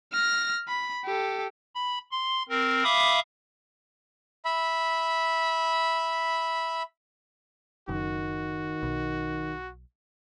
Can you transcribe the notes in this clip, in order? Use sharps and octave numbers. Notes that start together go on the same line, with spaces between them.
F6 A#6
B5
G4 A4
B5
C6
C4 A#4
E5 F5 B5 D6 D#6
E5 B5
F#1 D#3 F#4
B1